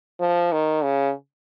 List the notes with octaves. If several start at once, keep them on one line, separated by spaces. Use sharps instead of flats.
F3
D#3
C#3